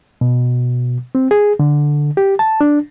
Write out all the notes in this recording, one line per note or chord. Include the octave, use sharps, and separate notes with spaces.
B2
C4
G#4
D3
G4
A5
D4